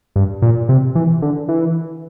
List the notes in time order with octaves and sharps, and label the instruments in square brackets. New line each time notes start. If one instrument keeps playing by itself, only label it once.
[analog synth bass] G2
A#2
C3
E3
D3
E3